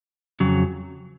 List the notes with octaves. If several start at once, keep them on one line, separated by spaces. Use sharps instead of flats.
F2 C#3 F#3